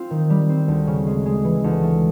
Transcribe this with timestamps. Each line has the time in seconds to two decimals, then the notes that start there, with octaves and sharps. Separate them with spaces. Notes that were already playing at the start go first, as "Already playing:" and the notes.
Already playing: C4 F4
0.10 D#3
0.30 G3
0.50 C4
0.68 D2
0.87 C#3
1.07 G#3
1.26 G#3
1.44 E3
1.64 D2
1.83 A3